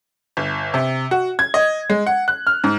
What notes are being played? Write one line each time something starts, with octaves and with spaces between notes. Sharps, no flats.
G1
C3
F#4
G#6
D#5
G#3
F#5
F#6
F6
G#2